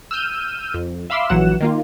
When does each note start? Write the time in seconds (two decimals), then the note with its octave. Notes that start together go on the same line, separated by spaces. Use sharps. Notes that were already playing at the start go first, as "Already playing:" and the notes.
0.11 E6 F6 G6 D#7
0.74 F2
1.10 E5 F5 B5 C6 D6 E6
1.29 A#1 E3 F#3 F#5 E7
1.61 D#3 A#3 F4